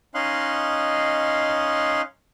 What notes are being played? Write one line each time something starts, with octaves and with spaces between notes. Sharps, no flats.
C#4 D#4 D#5 F5 C6 F#6